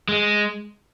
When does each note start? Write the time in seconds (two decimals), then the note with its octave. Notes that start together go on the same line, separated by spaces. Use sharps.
0.09 G#3